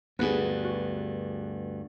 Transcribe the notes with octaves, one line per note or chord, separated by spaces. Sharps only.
D2 G2 B3 G#4
F#4